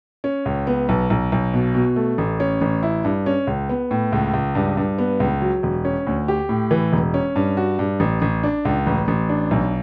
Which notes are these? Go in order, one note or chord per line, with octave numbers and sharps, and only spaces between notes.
C#4
C#2
B3
B1
B1
B1
B2
B2
A3
A1
C#4
A1
E4
G2
C#4
C#2
B3
A2
C#2
C#2
G2
G2
B3
C#2
F#3
E1
C#4
D2
G4
A2
E3
E1
C#4
G2
F#4
G2
A1
A1
D4
C#2
A1
A1
D4
B1